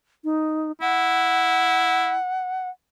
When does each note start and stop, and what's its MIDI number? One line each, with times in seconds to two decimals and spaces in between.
0.24 0.72 63
0.81 2.16 64
0.81 2.69 78